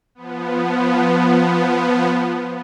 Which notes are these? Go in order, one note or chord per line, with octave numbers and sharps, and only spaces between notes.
F3 B3